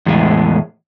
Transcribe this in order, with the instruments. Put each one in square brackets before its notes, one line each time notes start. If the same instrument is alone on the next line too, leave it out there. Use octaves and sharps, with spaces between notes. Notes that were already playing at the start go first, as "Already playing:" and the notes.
[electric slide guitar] E2 A2 G#3